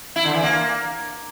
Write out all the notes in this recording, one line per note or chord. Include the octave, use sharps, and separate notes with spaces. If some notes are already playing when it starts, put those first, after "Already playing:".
E4
D3
E3
A#3